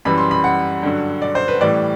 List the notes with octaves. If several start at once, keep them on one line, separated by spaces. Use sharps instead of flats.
F#2 E3 G3 B5
C6
B5
F#5
G2 D3 F#3
D5
C5
B4
A2 E3 G3 D5